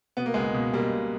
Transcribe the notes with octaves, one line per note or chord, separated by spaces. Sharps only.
B2 B3
A#3
C#2 G#3 B3
B2
C#2 G3 A#3
B2